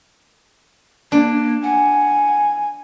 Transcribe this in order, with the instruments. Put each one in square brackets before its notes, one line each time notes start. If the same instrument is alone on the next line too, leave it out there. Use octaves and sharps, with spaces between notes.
[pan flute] A#3 [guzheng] D4
[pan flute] F#5 [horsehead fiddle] G#5